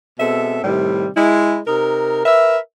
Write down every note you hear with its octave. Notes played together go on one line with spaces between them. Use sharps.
B2 G#3 C4 A4 E5
A2 C3 D#3 G3
G#3 E4
C3 D#4 A#4
A#4 B4 E5